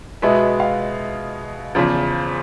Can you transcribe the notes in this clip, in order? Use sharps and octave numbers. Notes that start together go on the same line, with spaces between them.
B2 G#3 B3 E5
F5
E2 C#3 F3